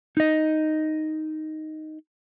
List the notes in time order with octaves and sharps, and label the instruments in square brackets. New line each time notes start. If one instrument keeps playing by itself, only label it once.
[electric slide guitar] D#4 D#5